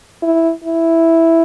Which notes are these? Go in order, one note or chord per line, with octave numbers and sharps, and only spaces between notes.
E4
E4